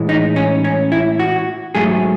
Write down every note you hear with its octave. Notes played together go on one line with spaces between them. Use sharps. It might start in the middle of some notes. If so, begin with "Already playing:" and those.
Already playing: A2 E3 G#3
D#4
C#4
C#4
E4
F#4
G#2 F#3 A3 G#4